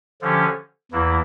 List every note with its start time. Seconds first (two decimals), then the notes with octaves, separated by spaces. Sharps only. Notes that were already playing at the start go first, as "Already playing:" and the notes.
0.21 D3 F3 C#4 G4
0.92 E2 E3 A#3 E4